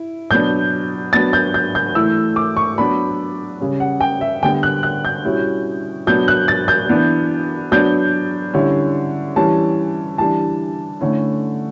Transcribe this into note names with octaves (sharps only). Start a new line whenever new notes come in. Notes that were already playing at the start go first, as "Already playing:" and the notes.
Already playing: E4
B2 F#3 B3 D4 G6
F#3 B3 D4 A6
G6
G6
G6
E3 A3 E4 E6
D6
C#6
F#3 B3 D4 B5
C#3 G3 C#4
F#5
G5
E5
D3 G3 B3 G5
F#6
F#6
G6
B2 G3 C#4 E4
B2 F#3 B3 D4 G6
F#6
A6
G6
E3 B3 D4
F#3 B3 D4 G6
D3 G3 C#4 E4
E3 G3 C#4 A5
E3 G3 D4 A5
D3 A3 C#4 E4